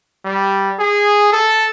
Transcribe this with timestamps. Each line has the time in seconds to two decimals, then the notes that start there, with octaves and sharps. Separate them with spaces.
0.25 G3
0.79 G#4
1.32 A4